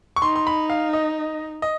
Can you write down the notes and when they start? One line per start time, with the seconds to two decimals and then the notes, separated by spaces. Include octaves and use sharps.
0.16 C#6
0.22 D#4 C6
0.36 C6
0.47 B5
0.70 F5
0.93 D#5
1.62 D#5